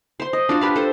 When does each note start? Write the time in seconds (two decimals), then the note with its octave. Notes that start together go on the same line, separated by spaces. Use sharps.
0.20 C5 C6
0.33 D#5
0.49 D4 F4 F#4
0.61 G4 B4 F5
0.76 A4 C5